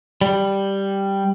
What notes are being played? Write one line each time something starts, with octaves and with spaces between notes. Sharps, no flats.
G3